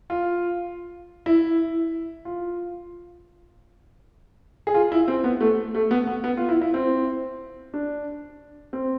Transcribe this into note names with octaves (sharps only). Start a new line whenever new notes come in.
F4
E4
F4
G#4
F4
E4
C4
B3
A3
A3
B3
B3
B3
F4
E4
E4
C4
D4
C4